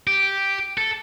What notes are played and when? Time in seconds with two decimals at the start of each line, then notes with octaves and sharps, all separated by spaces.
0.07 G4
0.78 A4